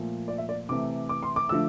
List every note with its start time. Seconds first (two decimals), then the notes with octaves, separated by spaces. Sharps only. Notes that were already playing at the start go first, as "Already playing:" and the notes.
Already playing: A#2 F3 A3
0.28 D5
0.38 E5
0.49 D5
0.69 C3 E3 A3 D6
1.09 D6
1.23 C6
1.36 D6
1.49 D3 F3 A3 E6